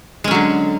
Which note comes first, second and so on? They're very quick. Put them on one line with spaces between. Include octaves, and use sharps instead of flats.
G#3 C#4 F#3 D3